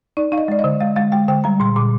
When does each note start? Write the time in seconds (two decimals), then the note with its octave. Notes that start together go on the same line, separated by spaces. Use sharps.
0.17 D#4 D5
0.32 D#4 F5
0.38 D#5
0.48 G#3 D5
0.59 D#5
0.64 D3
0.80 G#3 F5
0.96 G#3 F5
1.12 G#3 G5
1.28 D3 G5
1.44 G3 A#5
1.60 A#2 C6
1.76 A#2 D6